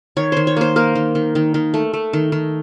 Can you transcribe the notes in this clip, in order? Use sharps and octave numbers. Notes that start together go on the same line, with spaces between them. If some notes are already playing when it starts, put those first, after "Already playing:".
D#3 C#5
D#3 C5
C#5
A#3 C5
A#3 A#4
D#3
D#3
D#3
D#3
A3
A3
D#3
D#3